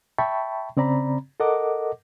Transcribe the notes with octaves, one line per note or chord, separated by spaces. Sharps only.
E5 G5 A5 B5 C#6
C#3 C4 D5 A#5 B5
A4 A#4 D#5 F#5 D6